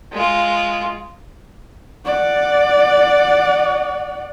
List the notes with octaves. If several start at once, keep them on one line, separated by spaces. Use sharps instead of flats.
G#3 F4
D5 F#5